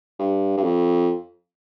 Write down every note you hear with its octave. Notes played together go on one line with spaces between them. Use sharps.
G2
G2
F2